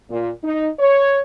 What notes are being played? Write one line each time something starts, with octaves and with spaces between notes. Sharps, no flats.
A#2
D#4
C#5